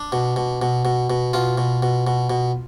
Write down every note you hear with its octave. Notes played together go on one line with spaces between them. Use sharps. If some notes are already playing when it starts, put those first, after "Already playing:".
Already playing: D4
B2
B2
B2
B2
B2
B2 F4
B2
B2
B2
B2